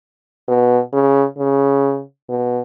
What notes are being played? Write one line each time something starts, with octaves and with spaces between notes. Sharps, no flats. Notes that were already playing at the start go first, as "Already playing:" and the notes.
B2
C#3
C#3
B2